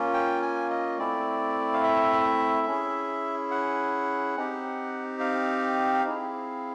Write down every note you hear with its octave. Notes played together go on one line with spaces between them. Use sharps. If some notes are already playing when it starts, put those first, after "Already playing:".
Already playing: A#3 C#4 F4
G5
G#5
D#5
A3 C4 E4 D5
F5
E5
C#4 E4 G#4
F#5
C4 D#4 G4
F5
C4 E4 G#4